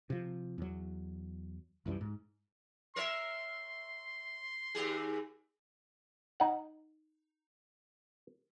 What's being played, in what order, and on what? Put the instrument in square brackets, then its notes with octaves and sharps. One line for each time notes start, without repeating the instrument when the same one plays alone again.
[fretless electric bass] C3 F3
E2 F#3
C2 F#2 E3 G3
G#2
[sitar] A#4 C#5 E5 [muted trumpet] C6
[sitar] D#2 G4 G#4
[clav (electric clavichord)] D#4 F#5